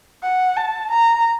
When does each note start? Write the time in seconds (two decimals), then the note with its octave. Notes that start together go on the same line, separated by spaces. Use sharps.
0.23 F#5
0.57 A5
0.91 A#5